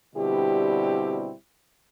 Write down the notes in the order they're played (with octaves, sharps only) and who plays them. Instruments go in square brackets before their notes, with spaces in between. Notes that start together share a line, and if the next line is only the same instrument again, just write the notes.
[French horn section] B2 D3 G3 C4 E4 G4